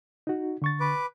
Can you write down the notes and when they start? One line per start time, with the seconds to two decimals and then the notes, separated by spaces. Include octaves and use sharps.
0.27 D#4 F#4
0.62 D3 C#6 A6
0.80 B4 D6